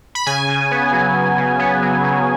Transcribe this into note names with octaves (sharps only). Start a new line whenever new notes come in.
B5
C#3 G#5
C#3
B3
F#3
C#3
C#3
B3
F#3
C#3